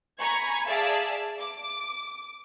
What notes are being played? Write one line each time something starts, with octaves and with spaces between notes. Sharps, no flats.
G#5 A#5 B5 C#6 G#6
G#4 D5 E5 F5 A5
D6